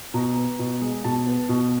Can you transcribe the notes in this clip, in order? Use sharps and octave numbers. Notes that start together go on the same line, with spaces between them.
B2 A#5
B3
B2
G#3
B2 A5
B3
B2